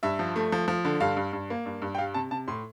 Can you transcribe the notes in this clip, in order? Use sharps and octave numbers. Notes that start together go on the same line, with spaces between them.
G2 E5
F3
A3
F3
F3
D3
G2 F5
G2
G2
A#3
G2
G2
G5
G3 F5
C3 A5
C3 A5
A2 C6